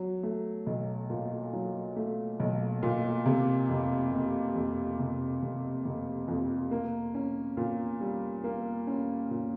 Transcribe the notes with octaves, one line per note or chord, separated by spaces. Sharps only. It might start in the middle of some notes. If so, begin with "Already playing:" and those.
Already playing: F#3
A3
B1
A#2
F#3
A3
B1
A#2
C3
F1
F1
F2
C3
F1
F1
F2
A#3
C#4
A#2
G3
A#3
C#4
A#2